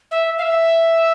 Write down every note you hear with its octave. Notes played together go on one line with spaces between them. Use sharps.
E5
F5
E5